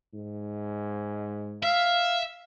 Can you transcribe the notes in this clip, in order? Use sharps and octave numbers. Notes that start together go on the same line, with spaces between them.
G#2
E5 F5